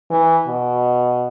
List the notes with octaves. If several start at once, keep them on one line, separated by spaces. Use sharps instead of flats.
E3
B2